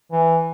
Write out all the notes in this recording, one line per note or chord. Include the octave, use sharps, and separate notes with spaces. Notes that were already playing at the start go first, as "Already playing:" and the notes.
E3